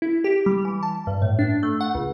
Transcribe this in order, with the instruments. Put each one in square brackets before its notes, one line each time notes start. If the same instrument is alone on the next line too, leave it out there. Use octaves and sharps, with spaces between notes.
[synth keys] E4
G4
G3
E3
A5
G2
A2
D4
A3
F#5
C#2